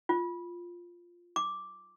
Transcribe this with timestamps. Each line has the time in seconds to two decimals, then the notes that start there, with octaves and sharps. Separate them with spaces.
0.09 F4
1.36 D6